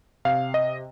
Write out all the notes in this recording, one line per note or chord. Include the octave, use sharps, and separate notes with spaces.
C3 F5
D#5